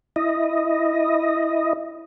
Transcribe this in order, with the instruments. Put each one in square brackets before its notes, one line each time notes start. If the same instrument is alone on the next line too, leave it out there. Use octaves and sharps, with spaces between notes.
[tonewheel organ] E4 D#5